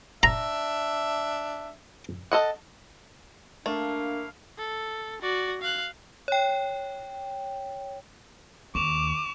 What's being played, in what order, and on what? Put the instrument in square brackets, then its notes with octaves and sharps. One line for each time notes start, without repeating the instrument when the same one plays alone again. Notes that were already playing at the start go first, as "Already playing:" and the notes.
[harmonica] D4 E5 [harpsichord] A#5
[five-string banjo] A4 D#5 F#5
[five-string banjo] A3 [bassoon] A#3 [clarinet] D4 [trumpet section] E4 F5
[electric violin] A4
F#4 D5
F5 F#6
[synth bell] C#5 G5
[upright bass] D#2 [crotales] C#6 E7 F7 [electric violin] D6